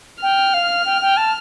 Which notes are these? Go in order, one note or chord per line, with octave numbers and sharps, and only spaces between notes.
G5 F6
F5
G5
G5
A5